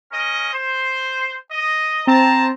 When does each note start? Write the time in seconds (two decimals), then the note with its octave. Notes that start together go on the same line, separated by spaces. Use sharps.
0.12 C#4 A#4 D#5
0.53 C5
1.51 D#5
2.07 C4 C5 A5 A#5